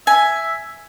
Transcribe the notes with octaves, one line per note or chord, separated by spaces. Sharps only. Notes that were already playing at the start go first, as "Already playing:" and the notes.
E5 G#5